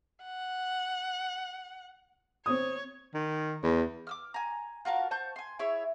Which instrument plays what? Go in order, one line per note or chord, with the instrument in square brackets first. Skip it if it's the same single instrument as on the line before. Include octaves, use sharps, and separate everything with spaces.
[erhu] F#5
[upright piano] C4 D#6 [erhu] C#5
[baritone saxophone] D#3
E2
[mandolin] D6 E6 F6
G#5 A#5
F4 F#4 A#4 A5
C5 A5 C#6 G6
G#5 C6
E4 G#4 C#5 E5